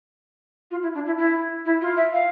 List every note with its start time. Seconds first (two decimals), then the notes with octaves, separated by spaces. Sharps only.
0.71 F4
0.82 E4
0.94 D4
1.06 E4
1.18 E4
1.65 E4
1.81 F4
1.96 E5
2.13 F5